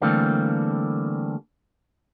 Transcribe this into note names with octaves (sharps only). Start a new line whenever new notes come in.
D3 E3 G3 A3 A#3 C4